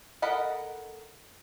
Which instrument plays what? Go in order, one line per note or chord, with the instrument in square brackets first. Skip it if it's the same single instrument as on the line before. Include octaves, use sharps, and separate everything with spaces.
[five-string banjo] A4 A#4 D#5 F#5 B5